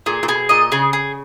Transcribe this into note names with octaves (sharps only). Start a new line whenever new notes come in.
A#2 G#4
A#2
B2 G#4
A#2 D#5
C#3 G#4
G#4